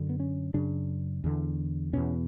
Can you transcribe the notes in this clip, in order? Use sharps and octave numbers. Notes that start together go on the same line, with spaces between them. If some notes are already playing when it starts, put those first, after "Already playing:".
Already playing: F#2 D3
B3
C#4
F#2 C#3 D4
E2 D3
E2 B2 C#4